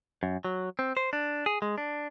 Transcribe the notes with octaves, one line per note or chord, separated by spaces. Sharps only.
F#2
F#3
C4
C5
D4
G#4
G#3
D4